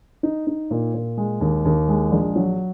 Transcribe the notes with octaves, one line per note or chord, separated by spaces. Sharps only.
D#4
D#4
A#2
A#2
G#3
D#2
D#2
G#3
A#1
F#3